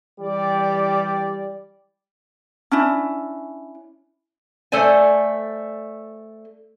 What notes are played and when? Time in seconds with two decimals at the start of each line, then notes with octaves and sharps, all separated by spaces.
0.21 E3 G3 G4 D5
2.72 C#4 D4 E4
4.72 A3 A4 C5 D5 G#5